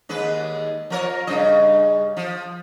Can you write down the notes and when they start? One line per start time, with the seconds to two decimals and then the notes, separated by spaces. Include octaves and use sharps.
0.09 D#2 G#3 B4
0.90 F3 A#4 C#5
1.27 G2 C#3 D#5
2.17 F3